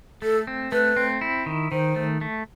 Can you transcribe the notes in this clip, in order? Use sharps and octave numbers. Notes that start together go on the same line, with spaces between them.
A3 A4
C4
A3 B4
C4
E4
D#3
D#3 C5
A3
A3